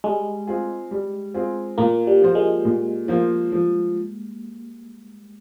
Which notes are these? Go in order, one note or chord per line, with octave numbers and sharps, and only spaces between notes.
G3 G#3
C4 F4 G#4
G3
C4 F4 G#4
A#2 A#3
G3
F3 A#3 F4 C5
G#3
A#2
F3 A#3 F4 C5
F3